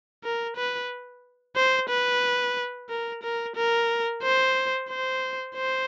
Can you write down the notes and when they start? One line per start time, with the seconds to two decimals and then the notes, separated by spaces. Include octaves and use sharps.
0.24 A#4
0.57 B4
1.56 C5
1.90 B4
2.90 A#4
3.23 A#4
3.56 A#4
4.23 C5
4.90 C5
5.56 C5